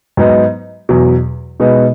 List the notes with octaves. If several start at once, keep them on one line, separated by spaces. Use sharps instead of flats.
G#2 F#3 B3 D#4
E2 B2 F#3
B2 G#3 B3 D#4